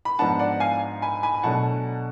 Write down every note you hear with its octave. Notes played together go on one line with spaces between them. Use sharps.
B5
G#2 F3 B3 D4 F#5 A5
D5 F#5
F5 G#5
G#5 B5
G#5 B5
B2 F#3 A3 D4 F#5 A5